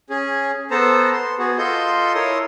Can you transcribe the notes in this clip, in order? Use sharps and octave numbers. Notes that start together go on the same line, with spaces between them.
C#4 G#4
B3 A4 C5 A5 A#5
C6
B3 F#4 G#4
F4 A4 D#5 C6 G6
E4 A4 A#4 C#5 C6 D#6